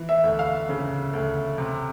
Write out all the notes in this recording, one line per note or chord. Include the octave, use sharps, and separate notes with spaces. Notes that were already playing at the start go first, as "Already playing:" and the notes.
Already playing: E3
E5
D2
F5
C#3
D2
C3